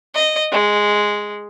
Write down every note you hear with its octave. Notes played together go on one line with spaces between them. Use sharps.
D#5
G#3